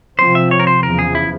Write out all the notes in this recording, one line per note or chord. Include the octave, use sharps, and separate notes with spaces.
C3 F3 C4 C5
E5
C#5
A#4
C5
E2 C#3 F3 A#4
G#4
E4